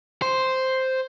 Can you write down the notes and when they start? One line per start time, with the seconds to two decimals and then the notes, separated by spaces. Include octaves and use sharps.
0.22 C5